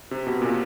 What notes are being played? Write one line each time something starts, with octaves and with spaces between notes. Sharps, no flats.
C3
B2
A#2